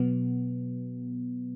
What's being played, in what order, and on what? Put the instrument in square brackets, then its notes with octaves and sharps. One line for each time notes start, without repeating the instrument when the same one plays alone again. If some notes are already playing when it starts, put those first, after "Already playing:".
Already playing: [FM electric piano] B2 F#3 B3